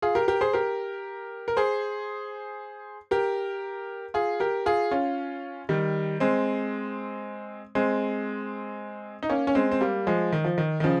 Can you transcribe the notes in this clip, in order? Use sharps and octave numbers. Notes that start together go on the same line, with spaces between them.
F4 G#4
G4 A#4
G4 A#4
G#4 C5
G4 A#4
A#4
G#4 C5
G4 A#4
F4 G#4
G4 A#4
F4 G#4
C#4 F4
D#3 G3
G#3 C4
G#3 C4
D#4
A#3 C#4
C#4
G#3 C4
C4
G3 A#3
F3 G#3
D#3
F3
D#3
D#3
C#3 F3